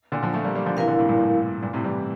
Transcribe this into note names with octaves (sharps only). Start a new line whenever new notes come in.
A#2 D3
D3 F3
F3 A3
G3 A#3
G3 A#3
D3 F3
C3 E3 E4 A#4 F5
A#2 D3
A2 C3
G2 A#2
A2
G2 A#2
A2 C3
E3 G3